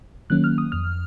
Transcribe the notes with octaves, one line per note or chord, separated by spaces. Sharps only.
D#3 F#3 A#3 C#4 F#6
F6
D#6
F2 F6